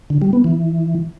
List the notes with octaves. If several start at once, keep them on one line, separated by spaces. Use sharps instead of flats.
D3
G3
B3
E3